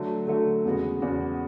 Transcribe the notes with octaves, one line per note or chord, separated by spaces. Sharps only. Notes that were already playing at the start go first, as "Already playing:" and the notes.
Already playing: D3 F#3 A3
D3 F#3 A3
E2 C#3 G#3 B3 F#4
E2 C#3 G#3 B3 F#4